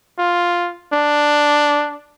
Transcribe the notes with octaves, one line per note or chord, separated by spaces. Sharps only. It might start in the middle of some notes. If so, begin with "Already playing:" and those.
F4
D4